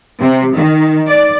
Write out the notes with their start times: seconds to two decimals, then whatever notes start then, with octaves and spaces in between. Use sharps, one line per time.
0.19 C3
0.56 D#3
1.09 D5